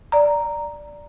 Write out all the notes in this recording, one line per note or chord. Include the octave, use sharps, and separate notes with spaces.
D5 A#5